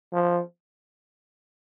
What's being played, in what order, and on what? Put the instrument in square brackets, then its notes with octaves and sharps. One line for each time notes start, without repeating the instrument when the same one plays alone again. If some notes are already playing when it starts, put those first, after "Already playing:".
[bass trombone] F3